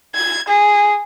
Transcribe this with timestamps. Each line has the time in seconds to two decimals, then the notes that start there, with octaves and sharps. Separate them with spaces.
0.15 G#6
0.48 G#4